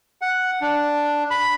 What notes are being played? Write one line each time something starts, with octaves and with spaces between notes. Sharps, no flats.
F#5
D4
B5